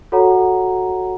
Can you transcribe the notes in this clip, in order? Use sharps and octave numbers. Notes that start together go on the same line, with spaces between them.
F#4 A4 C#5 F#5 A#5